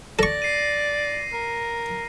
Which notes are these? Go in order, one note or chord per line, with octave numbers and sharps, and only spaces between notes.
A4 D5 C#6 A#6
C7 D#7
A#4